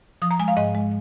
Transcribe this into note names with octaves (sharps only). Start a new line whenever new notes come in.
F3 D#6
A#5
G#3 G#5
F5
G#2 D#5
G#3